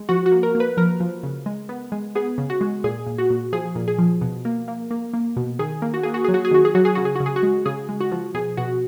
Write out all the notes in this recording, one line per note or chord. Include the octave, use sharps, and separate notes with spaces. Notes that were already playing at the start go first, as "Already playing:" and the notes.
Already playing: G#3
F3 F#4
F#4
A#3
A#4
A#3
B4
F3 A#4
F3
C#3
G#3
B3
G#3
B3 G#4
C#3
F#4
G#3
A#2 G#4
A#2
F#4
A#2
F3 G#4
A#2
G#4
F3
B2
A#3
A#3
A#3
A#3
B2
D#3 G#4
A#3
F#4
A#3 G#4
F#4
F#3 G#4
F#4
G#4
D#3 F#4
G#4
F#3 F#4
G#4
C#3 F#4
G#4
C#3 F#4
G#4
F#4
G#3
C#3 G#4
G#3
F#4
F3
B2 G#4
B2 F#4